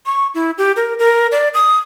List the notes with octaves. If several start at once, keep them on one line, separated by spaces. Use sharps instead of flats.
C#6
E4
G4
A#4
A#4
D5
D#6